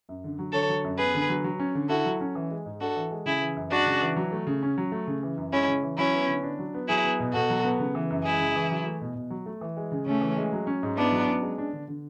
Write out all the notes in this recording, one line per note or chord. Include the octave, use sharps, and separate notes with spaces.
F#2
D3
F#3
D3 A4 C#5
F#3
F#2
B3 G#4 B4
D3
F#3
F#3
C#4
D3
E4 F#4 A4
F#3
C#4
E3
G#3
G#2
D4 F#4 A4
E3
G#3
C#3 E4 G#4
E3
F#2
G#3 D4 F#4
C#3
E3
F#3
A3
C#3
C#4
F#3
A3
C#3
E3
F#2
G#3 C#4 E4
C#3
E3
F#3 C#4 E4
B3
D3
D4
F#3
B3
F#3 E4 G#4
B3
B2
B2 F#4 A4
F#3
B3
C#3
E3
F#2
G#3 E4 G#4
C#3
E3
F#3
A3
B2
B2
F#3
A3
E3
G#3
C#3
C#3 A3 C#4
E3
G#3
F#3
C#4
G#2
B3 D4 E4
F#3
C#4
G#3
D4
D3
D3